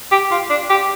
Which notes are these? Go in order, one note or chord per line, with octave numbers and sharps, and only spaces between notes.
G4
F4
D4
G4